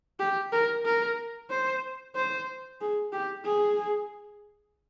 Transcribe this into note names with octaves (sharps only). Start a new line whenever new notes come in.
G4
A#4
A#4
C5
C5
G#4
G4
G#4